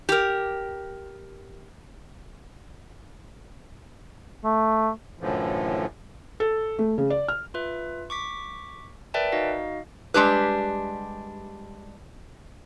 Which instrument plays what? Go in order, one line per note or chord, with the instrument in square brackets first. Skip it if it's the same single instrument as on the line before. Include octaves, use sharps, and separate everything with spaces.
[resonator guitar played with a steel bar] G4 A#4
[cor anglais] A3
[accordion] F#2 A2 D3 E3 F3
[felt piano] A4
A3
C#3
D5
F6
[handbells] F4 B4 E5
C#6 D6 B6
A#4 B4 D5 E5 G5 A5
D#4 F#4 D#5 F5
[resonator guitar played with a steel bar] G3 G#3 D4 G4 B4